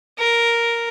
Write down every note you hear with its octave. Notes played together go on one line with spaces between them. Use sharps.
A#4